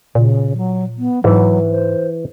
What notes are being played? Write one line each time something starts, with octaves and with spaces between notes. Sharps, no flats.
A#2 C#3
F#3
B3
G#2 E3 F#3
C5